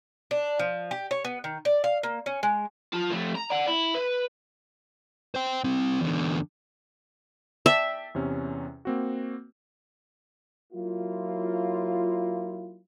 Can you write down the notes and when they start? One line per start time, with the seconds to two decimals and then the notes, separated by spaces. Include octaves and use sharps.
0.31 D4
0.59 F3
0.91 G4
1.11 C#5
1.25 B3
1.44 D#3
1.65 D5
1.84 F5
2.03 A#3
2.26 C#4
2.43 G#3
2.93 F4 A5
3.11 F2 A3
3.36 A#5
3.50 D5 F#5
3.68 E4
3.94 B4
5.35 C5 G5
5.64 G3 C4
6.01 E2 D3
7.66 D5 E5 G5 A5
8.15 E2 C3 C#4
8.85 A#3 C4 F#4
10.73 F#3 A#3 E4 F4